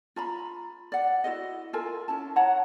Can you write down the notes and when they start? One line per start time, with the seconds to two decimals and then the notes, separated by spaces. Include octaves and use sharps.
0.16 F4 A#5 B5
0.92 D5 F#5
1.24 E4 F#4 G#4 D#5
1.73 F4 A4 A#4 G#5
2.08 C#4 E4 A5
2.36 C#5 F#5 A5 A#5